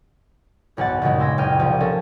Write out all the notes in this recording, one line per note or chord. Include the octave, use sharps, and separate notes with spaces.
F#1 B1 G#2 F#5 A6
B1 G2 A#2 C#3 F#3 G#3
C6 D6 E6 G#6 A#6
F#1 C#2 G5 F6 D#7
C2 F3
C#4 A4 A#4